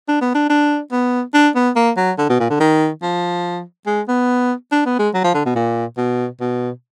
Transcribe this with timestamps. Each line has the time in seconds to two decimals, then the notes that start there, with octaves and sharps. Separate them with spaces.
0.08 D4
0.21 B3
0.35 D4
0.50 D4
0.92 B3
1.34 D4
1.55 B3
1.76 A#3
1.97 F#3
2.18 D3
2.29 B2
2.40 A#2
2.50 D3
2.60 D#3
3.02 F3
3.86 G#3
4.08 B3
4.72 D4
4.86 B3
4.99 G#3
5.14 F#3
5.24 F3
5.34 D3
5.46 B2
5.56 A#2
5.97 B2
6.40 B2